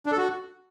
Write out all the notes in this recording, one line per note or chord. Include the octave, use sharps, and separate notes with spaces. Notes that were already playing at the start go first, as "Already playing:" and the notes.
D4
A4
F#4